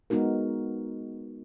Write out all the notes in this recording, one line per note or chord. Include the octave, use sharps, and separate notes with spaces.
G#3 B3 D#4 F#4 A#4